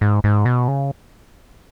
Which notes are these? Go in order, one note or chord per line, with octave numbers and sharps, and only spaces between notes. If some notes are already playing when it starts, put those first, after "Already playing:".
G#2
G#2
B2
C#3